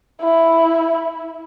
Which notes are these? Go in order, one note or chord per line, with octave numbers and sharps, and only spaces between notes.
E4